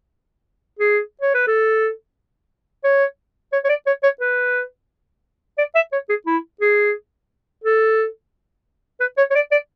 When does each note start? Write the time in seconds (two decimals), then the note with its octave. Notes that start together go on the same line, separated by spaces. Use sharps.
0.79 G#4
1.21 C#5
1.34 B4
1.47 A4
2.84 C#5
3.53 C#5
3.64 C#5
3.69 D5
3.87 C#5
4.03 C#5
4.21 B4
5.58 D5
5.75 E5
5.92 C#5
6.09 G#4
6.27 E4
6.61 G#4
7.64 A4
9.00 B4
9.18 C#5
9.31 C#5
9.35 D5
9.51 D5